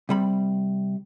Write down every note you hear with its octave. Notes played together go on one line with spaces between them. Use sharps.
C3 G3 B5